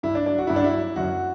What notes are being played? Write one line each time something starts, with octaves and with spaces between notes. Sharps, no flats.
G2 E4
D4
F#3 D4
F#4
G2 E4
D4
E4
F#3
F#2 F#4